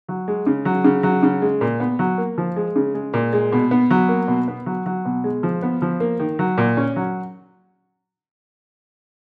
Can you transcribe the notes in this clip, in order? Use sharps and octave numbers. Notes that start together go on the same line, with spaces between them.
F#3
G#3
C#3
F#3
C#3
F#3
C#3
G#3
A#2
B3
F#3
A#3
F3
G#3
C#3
G#3
A#2
G#3
B2
B3
F#3
A#3
B2
B3
F#3
F#3
B2
G#3
F3
B3
F3
A#3
D#3
F#3
A#2
C#4
F#3